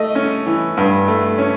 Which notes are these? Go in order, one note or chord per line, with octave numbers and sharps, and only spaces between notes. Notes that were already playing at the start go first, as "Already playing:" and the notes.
Already playing: A3 D#5
C#4
E3
G2
A3
C#4